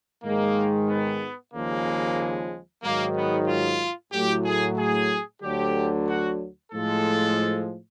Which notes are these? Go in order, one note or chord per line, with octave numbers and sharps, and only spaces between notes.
G#2 D#3 G#3 A#3
B3
D#2 C#3 F3 G#3 A#3
G#2 D#3 F#3 A#3
B3
F4
A2 F#3 G4
G#4
G#4
D2 D3 F#3 G4
F#4
A2 F3 G#3 A4